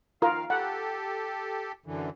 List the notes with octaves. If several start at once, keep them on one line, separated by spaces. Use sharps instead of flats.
D#3 F4 A#4 F5
G4 A4 F#5
F#2 D3 E3